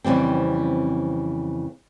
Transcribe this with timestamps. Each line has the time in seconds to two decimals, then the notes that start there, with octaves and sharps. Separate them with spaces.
0.04 F2 C#3 E3 G3 C4